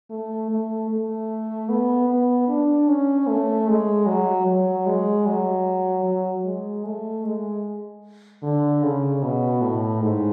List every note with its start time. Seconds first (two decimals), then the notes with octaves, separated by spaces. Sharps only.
0.10 A3
0.51 A3
0.90 A3
1.69 B3
2.09 B3
2.48 D4
2.88 C#4
3.27 A3
3.68 G#3
4.07 F#3
4.47 F#3
4.87 G#3
5.26 F#3
6.05 F#3
6.45 G#3
6.85 A3
7.24 G#3
8.43 D3
8.83 C#3
9.23 B2
9.62 A2
10.01 G#2